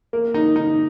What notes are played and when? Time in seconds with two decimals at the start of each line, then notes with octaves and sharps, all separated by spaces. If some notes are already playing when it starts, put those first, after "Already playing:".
0.13 A#3
0.34 D#4
0.56 D#4